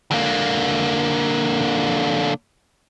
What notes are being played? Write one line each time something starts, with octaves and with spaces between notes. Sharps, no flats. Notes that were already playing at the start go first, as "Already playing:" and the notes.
D3 A#3